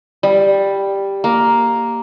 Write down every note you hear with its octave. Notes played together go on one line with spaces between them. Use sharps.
G3
A#3